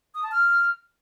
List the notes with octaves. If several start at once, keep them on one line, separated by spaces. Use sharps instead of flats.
D#6
A5
F6